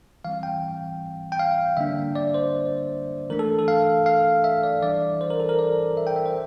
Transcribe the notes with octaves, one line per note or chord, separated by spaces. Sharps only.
E3 G3 C4 F5
G5
G5
F5
D3 G3 A#3 D4 E5
D5
C5
E3 A3 D4 A#4
A4
A4
F5
F5
E5
D5
E3 G3 D4 D5
C5
A#4
A4
A#4
D5
E5
G5
E5
C5